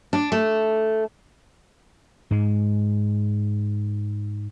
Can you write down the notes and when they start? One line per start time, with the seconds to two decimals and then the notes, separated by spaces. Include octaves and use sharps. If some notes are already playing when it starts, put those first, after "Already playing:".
0.13 D4
0.32 A3
2.31 G#2 G#3